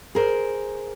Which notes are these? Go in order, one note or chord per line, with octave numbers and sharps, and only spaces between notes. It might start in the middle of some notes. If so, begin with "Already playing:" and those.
G#4 A#4 C5